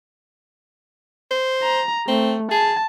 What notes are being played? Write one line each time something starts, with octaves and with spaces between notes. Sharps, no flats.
C5
A#5
A3 C4
G#4 A5